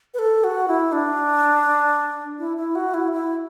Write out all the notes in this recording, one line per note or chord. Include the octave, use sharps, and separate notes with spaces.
B4
A4
F#4
E4
D4
E4
E4
F#4
E4
E4